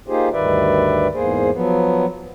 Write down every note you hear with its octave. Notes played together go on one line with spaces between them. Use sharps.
A#3 D#4 F4 G4 G#4 C5
D2 G2 D#3 B4 D5 E5
E2 G#2 A#3 G#4 C5
F3 F#3 B3